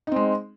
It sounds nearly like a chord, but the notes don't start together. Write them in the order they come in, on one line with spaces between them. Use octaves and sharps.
D#4 C4 G#3